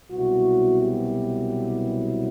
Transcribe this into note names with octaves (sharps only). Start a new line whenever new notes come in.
C2 B2 F#3 B3 E4 F#4
G4